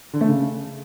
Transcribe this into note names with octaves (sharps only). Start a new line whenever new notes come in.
D3
A3
C#3